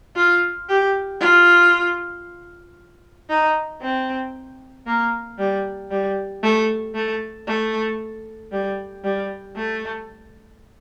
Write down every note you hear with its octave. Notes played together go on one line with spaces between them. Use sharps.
F4
G4
F4
D#4
C4
A#3
G3
G3
A3
A3
A3
G3
G3
A3